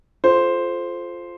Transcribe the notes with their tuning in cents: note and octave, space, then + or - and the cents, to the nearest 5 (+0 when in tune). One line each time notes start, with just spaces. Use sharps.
F4 +0 A4 -25 C5 +0